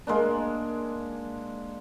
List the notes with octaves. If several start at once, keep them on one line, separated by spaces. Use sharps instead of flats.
G#3 A#3 D4